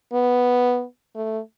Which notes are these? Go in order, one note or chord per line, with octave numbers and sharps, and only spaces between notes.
B3
A3